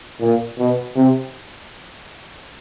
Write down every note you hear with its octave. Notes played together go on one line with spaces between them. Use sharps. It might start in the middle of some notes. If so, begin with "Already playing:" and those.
A#2
B2
C3